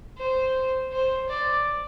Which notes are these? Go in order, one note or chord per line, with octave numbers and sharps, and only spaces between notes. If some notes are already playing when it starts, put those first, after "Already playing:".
C5
C5
D5